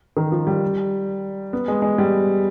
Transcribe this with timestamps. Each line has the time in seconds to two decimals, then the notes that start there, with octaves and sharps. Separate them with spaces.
0.17 D#3
0.32 F3
0.47 G3
1.53 B3
1.68 G#3
1.82 G#3
1.98 G3